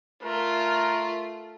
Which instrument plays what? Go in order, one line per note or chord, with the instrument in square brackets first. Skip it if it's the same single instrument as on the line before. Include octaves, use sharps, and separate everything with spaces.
[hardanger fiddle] A3 F4 [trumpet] A#4